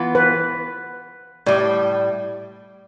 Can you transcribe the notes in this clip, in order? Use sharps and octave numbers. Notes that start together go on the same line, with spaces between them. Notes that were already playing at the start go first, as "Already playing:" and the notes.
Already playing: E3 B3 F4
B4
A2 G3 D5